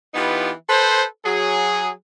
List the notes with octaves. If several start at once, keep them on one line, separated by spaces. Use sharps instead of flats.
E3 B3 D#4 F4 G4
A4 B4 C5
F#3 G#4